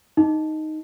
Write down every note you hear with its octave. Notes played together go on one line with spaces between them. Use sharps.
D#4